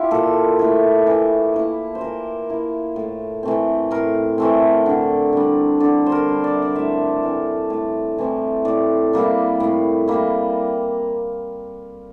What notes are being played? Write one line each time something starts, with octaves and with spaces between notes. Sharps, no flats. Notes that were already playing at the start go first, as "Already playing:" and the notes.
Already playing: E4 F4 G4
A#2 A4
A3 E4
E3
A#3 E4
C5
E3 A#4
A#3 E4
A2
E3 A3 C4
A2 A#4
E3 A3 C4
D3
G3 D4
D3 D5
C5
A#4
G3 D4
D5
E5
D5
A2 E5
E3 A3 C4
A2
E3 A3 C4
A2 D5
G3 A#3 E4
A2
G3 A#3 E4